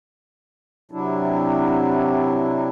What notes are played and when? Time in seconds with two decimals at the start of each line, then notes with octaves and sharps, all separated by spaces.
0.91 C3 F#3 D4 E4